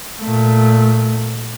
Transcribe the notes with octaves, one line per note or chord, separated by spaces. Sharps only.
A#2 A3